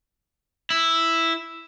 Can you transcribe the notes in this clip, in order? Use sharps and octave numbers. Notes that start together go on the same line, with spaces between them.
E4